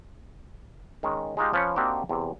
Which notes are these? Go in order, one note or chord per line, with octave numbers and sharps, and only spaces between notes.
D#3 G#3 C#4
G#3 D#4 F4 G4
F3 C#4 B4 C#5
A#3 C4 D4 D#4 F#4 G4
E2 C3